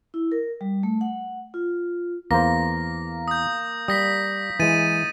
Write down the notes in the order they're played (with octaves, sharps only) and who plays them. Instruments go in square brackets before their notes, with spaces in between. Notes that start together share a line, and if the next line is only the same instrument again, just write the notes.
[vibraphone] E4
A#4
G3
A3
F#5
F4
[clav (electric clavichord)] E2 C5 [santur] A#3 [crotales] A#6
[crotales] D#6 G6
[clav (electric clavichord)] G3 [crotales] D#6 A#6 B6
[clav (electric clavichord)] E3 G#3 [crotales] A6 D#7